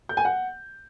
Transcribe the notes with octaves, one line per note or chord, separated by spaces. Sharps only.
G6
G#5
F#5